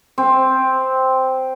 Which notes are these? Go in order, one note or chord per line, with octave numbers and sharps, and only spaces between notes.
C4